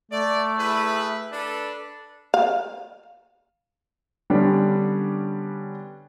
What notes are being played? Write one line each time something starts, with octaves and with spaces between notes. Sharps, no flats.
A3 D5
E4 G#4 B4
D4 A4 B4
F5
D3 G3 B3 C#4 D4